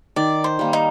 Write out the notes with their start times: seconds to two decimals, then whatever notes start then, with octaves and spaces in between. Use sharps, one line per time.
0.16 D#3 D5
0.44 C5
0.59 G3 A#3
0.73 D#4